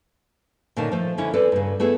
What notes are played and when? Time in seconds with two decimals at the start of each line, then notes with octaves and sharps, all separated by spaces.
0.77 A#2 D3 D#3 C#4 A5
0.92 F3 A3
1.18 D3 C#4 E4
1.34 C4 A4 B4 D5
1.52 G2 C#3
1.80 A3 B3 E4 G#4